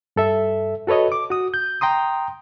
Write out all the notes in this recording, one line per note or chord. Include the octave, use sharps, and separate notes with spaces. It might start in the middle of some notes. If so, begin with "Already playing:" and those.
G2 A4 E5
F#4 A4 B4 C#5 D#5
D6
F#4 D#6
G6
G5 A#5 C6 D#6